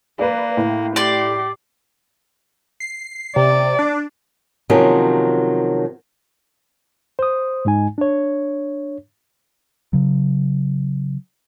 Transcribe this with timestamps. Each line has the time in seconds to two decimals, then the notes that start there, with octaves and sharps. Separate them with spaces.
0.19 A#3 B4 D5
0.57 A2
0.96 G4 D5 C6
2.80 C7
3.36 C3 D5
3.79 D4
4.70 C3 D#3 F3 F#3 A#3 C#4
7.19 C5 D#6
7.65 G#2 G#3 D#4 G#5
7.98 D4 C#5
9.93 C#3 F#3